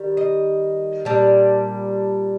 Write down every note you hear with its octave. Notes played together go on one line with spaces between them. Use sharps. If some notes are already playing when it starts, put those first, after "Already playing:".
Already playing: D#3 G3
D#5
A#2 G3 D4